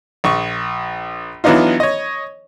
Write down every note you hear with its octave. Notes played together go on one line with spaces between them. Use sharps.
A#1 C#6
E3 F#3 B3 D4 D#4 F4
C#5 D#5